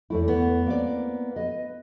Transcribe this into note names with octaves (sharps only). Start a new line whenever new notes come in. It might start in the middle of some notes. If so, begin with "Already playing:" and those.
E2 A3 E4
B3
A#3 C4 D5
B4 D#5